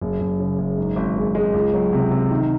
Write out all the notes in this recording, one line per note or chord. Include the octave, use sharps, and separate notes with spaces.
F#1
F#1
C#3
F#1
G#2
G#1
G#3
G#3
C#2
F#3
C3
C3
D#3